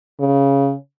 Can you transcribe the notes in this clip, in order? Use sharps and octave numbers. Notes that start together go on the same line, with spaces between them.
C#3